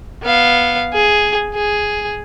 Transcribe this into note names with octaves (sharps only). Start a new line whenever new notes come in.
B3 F5
G#4
G#4